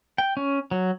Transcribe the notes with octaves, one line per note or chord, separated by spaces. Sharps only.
G5
C#4
F#3